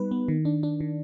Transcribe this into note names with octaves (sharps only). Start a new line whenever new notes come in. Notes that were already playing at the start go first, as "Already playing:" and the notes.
Already playing: G3 B3 D#4 B4
B3
D#3
D4
D4
D#3